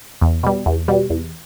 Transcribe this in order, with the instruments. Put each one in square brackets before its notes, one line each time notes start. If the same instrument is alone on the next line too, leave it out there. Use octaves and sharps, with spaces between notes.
[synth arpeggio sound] E2
B2 G3
E2
B2 G3
E2